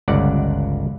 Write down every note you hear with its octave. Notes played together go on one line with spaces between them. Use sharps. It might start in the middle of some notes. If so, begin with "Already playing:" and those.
G1 C#2 D5 F#5